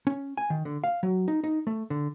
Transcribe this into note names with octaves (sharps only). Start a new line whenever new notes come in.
C#4
G#5
D#3
D3
F5
F#3
D#4
D#4
A3
D3